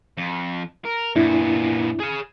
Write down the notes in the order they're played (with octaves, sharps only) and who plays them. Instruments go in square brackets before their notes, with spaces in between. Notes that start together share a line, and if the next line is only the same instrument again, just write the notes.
[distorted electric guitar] F2
A#4
[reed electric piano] F#2 D4 E4 [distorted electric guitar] A#2 B3
[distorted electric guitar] G#4 F5